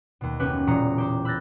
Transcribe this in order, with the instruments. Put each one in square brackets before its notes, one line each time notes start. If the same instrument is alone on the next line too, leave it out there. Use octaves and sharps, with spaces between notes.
[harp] D#2 B2
F#1 B3 C#4 F#4 G4 B4
E1 A#2 F#3 A#5 D#6 C#7
G4 C5 D6
B5 E6 F#6 G6 A6 A#6